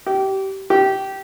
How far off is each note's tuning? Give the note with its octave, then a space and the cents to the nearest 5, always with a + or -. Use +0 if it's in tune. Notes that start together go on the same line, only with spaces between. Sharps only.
G4 -25
G4 -15